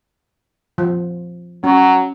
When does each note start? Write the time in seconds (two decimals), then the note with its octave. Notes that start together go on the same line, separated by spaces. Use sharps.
0.78 F3
1.64 F#3 C#4